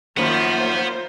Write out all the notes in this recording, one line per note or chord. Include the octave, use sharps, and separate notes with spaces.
F#2 D#3 F3 A#3 F4 C5 F#5 B5